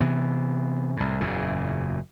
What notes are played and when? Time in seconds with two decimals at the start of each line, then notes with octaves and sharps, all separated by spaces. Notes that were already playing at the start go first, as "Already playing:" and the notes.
0.01 C3 E3 B3
0.97 C2 A2
1.21 F#1 E2 A#2 C#3